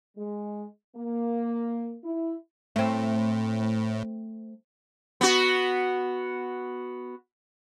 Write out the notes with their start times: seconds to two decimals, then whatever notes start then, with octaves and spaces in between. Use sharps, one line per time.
0.17 G#3
0.96 A#3
2.03 E4
2.76 A2 A3 C4
5.21 B3 F#4